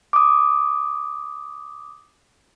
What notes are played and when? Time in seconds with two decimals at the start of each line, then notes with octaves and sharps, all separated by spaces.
0.13 D6 D#6